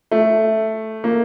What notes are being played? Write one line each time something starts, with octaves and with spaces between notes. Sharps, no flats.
A3
A#3